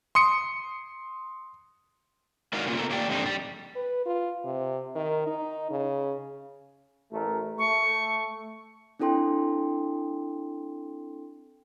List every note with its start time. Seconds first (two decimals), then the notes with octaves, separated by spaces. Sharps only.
0.15 C6 D#6 C#7
2.53 G#3 D#4 F#4 A#4 D5 F5
2.66 A2 C#3 G3 A#3 F4
2.77 B3 A4 A#4
2.90 A#3 D4 G4 D5 F#5 G5
3.08 F2 G#2 D3 G3 C4 D#4
3.26 G3
3.76 B4
4.06 F4
4.44 C3
4.95 D#3
5.27 D#4
5.71 C#3
7.12 A1 A3 A#4
7.58 A3 C#6
8.99 C4 D4 E4 A4 G5 C6